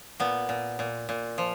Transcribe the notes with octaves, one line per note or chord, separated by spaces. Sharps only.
A#2 B3
A#2
A#2
A#2
F3